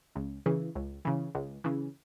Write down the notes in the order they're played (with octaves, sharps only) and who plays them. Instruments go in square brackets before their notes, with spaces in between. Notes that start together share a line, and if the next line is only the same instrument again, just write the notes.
[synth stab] C#2
C#3 E3
C#2
C#3 E3
C#2
C#3 E3